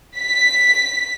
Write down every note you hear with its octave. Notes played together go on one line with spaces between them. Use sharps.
B6